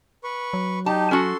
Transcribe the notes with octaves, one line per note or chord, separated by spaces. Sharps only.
B4 C#6
F#3
D#4 G4 A5
C#4 F#4 A4 C6